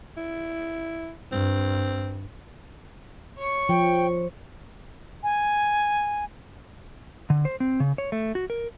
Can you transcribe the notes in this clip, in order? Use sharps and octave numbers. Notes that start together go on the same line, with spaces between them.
E4
G2 C4
C#5 C#6
F3 G5
G#5
D3
C5
C4
C#3
C#5
A3
F#4
A#4